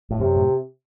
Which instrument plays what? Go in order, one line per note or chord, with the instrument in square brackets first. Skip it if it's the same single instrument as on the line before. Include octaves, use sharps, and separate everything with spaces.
[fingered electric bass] A2
[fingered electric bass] F#2 [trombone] C3
[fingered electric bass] A2